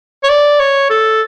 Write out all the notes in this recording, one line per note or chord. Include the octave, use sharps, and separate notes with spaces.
C#5
D5
C#5
A4